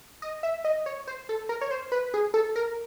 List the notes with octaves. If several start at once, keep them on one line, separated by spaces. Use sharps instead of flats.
D#5
E5
D#5
C#5
C5
A4
A#4
C#5
C5
B4
G#4
A4
A#4